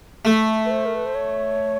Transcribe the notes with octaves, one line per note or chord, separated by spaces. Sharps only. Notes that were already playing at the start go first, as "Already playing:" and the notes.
A3
B4
C5
A#4
B4
C5
C#5